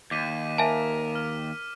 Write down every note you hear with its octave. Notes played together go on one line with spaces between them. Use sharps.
D#2 D6 B6 D#7
A#4 E5 G#5 A5
F6